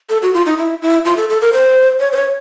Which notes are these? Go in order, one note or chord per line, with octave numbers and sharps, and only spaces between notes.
A4
F#4
F4
D#4
E4
E4
F4
A4
A4
A#4
C5
C#5
C5
C#5